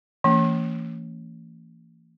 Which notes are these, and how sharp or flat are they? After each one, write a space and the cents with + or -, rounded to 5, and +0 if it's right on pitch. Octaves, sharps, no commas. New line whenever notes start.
E3 +10 A#3 -40 C#4 +20